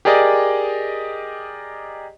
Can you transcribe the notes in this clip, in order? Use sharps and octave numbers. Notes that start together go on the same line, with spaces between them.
G4 G#4 A#4 D5 D#5